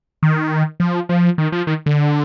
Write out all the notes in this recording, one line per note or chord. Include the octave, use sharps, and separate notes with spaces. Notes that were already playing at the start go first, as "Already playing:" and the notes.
D#3
F3
F3
D#3
F3
D#3
D3